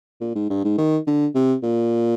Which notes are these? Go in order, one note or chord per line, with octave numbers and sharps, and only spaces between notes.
A#2
G#2
G2
G#2
D#3
D3
C3
A#2